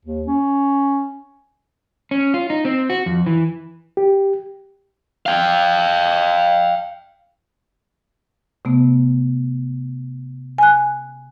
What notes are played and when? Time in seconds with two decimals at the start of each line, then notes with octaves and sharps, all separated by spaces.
0.05 D#2
0.27 C#4
2.11 C#4
2.34 F4
2.50 D#4
2.65 C4
2.90 F#4
3.06 F2
3.26 E3
3.97 G4
5.26 F5 G5
8.65 C3 A3 B3
10.58 G#5 F#6